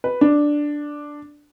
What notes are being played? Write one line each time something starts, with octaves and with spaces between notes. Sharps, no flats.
B4
D4